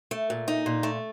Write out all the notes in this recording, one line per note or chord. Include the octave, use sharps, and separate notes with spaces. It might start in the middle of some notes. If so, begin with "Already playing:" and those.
A3
A#2
D#4
A#2
A3